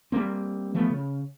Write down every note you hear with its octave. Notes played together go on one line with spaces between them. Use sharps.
G3 G#3 A#3 C4
E3 F3 A3 B3
C#3